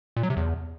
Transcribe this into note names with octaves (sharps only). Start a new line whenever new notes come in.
A#2
F#3
C3
E2